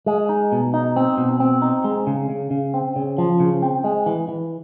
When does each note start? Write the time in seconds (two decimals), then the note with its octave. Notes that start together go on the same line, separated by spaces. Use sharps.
0.06 G#3
0.29 D#4
0.52 B2
0.74 D#4
0.96 C4
1.18 B2
1.40 C4
1.62 D#4
1.84 G#3
2.07 C#3
2.30 C#3
2.51 C#3
2.74 C4
2.96 C#3
3.18 F3
3.40 C#3
3.62 C4
3.84 G#3
4.06 E3
4.28 E3